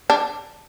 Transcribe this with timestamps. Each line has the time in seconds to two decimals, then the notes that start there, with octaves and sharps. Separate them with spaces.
0.10 D4